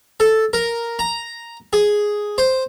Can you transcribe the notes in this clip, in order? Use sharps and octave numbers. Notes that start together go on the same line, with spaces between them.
A4
A#4
A#5
G#4
C5